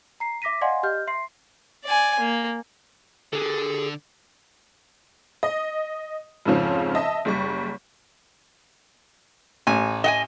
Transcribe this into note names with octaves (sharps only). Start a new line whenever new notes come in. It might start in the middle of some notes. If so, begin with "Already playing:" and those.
A#5 C7
E5 D6 A#6 B6 D#7
D5 D#5 F5 F#5 G#5 C6
G4 D#5 F6 G6
E5 C6 C7
D5 G#5
A#3
D3 G#4 A4
D#5
F2 G#2 C#3 F3 C#4
D#5 E5 A5
F#1 G3 C#6
A1 G#5
D#5 F#5 G#5